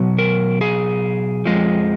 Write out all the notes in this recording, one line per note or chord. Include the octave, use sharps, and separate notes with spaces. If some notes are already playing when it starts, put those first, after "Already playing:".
Already playing: B2 F#3
A#4
G#4
F2 F3 G#3